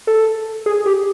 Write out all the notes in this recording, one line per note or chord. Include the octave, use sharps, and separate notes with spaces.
A4
G#4
G4